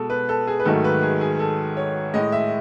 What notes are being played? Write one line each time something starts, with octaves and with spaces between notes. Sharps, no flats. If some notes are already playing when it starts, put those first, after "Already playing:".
Already playing: B2 G#3 A4
B4
A4
G#4
B4
G#2 D#3 F#3 A3 A4
B4
G#4
G#4
A4
C#5
A2 G#3 D#5
E5